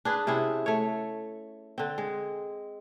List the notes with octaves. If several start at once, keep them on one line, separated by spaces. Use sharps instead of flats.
D4 G#4 B4
C3 C#4 E4 G#4
A3 C#5
D3 C4
G#3